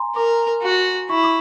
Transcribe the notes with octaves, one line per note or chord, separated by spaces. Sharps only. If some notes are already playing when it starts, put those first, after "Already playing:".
Already playing: G#5 A#5 C6
A#4 D6
F#4
E4 C#6
D6